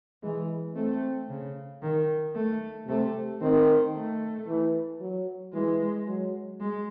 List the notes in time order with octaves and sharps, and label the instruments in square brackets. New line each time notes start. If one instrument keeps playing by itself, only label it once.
[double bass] E3 [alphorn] G#3
[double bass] A3 [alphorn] C4
[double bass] C#3
D#3
A3
[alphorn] C3 [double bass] A3
[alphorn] D#3 [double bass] C4
[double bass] A3
[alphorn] E3
F#3
[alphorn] E3 [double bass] G#3
[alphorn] F#3
[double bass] G#3